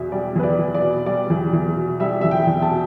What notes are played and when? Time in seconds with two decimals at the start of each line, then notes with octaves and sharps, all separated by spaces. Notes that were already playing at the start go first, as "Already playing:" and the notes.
Already playing: E2 B2 E5
0.12 G3 D5
0.36 E2 B4
0.43 D5
0.59 E2
0.74 D5
0.82 B2
1.06 G3 D5
1.30 E2
1.53 E2
1.76 B2
2.00 G3 E5
2.21 E2 E5
2.31 G5
2.47 E2
2.62 A5
2.71 B2